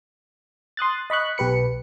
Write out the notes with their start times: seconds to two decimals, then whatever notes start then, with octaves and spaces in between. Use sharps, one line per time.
0.77 C6 D#6 F#6 A6
1.10 D#5 B5 C#6 F#6
1.38 B1 G4 B4 C#7